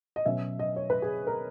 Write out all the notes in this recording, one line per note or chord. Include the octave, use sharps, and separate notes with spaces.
D#5
B2 F#3 C#4 E5
D#5
C#5
B4
G#4
A#4